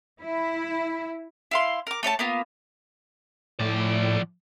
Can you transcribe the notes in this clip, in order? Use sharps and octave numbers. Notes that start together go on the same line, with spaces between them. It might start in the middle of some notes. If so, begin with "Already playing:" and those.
E4
E4 F5 C6
A#4 D6
A3 C#5 E5 A5
A#3 B3 F4
A2 F3 D5